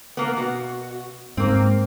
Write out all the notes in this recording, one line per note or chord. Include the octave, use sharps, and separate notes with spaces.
A#3 B3
B2 F#4
G#2 A#3 C4